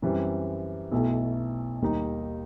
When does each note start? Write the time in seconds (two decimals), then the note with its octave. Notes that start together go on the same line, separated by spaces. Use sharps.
0.02 F#2 E3 G3 C4
0.92 B1 B2 A3 E4
1.82 D#2 D#3 G3 D#4